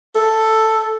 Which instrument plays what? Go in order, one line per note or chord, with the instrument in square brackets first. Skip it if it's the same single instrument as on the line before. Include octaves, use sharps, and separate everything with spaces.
[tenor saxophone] A4